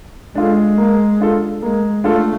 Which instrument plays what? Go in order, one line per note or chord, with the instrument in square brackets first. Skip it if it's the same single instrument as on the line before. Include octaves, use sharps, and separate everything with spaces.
[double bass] G#3 [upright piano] D4 F4 A4
[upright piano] A#3
D4 F4 A4
[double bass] G#3 [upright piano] A#3
[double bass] A3 [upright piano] D4 F4 A4